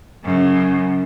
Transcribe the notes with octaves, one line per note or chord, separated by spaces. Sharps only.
F#2 C#3